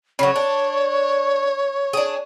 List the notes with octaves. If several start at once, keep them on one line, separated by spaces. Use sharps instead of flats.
C#3 F#3 C#5
D4
D4 G#4